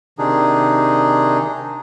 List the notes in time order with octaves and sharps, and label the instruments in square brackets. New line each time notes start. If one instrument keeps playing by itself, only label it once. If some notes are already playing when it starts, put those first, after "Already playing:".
[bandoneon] C3 D#3 D4 D#4 G#4